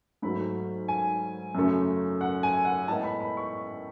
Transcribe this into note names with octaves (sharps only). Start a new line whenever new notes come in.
G#2 F#3 A3 B5
G#5
F#2 C#3 F#3 A3
F#5
G#5
F#5
A2 G#3 B3 A5
B5
B5
C#6